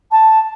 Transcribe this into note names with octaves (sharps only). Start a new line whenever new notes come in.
A5